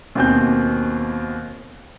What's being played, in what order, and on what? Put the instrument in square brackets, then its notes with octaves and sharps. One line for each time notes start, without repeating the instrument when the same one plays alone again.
[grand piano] D#2 B2 C4 G#5 G6